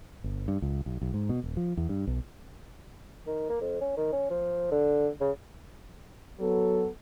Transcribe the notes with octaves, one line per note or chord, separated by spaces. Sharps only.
G1
G2
C#2
B1
B1
G#2
B2
D#1
F3
E2
G2
B1
D#3
A#3
F2
C#4
D#3
C#4
F3
D3
C#3
F#3 B3 A4